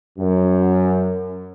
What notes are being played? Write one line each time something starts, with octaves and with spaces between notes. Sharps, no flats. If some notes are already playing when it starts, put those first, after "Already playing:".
F#2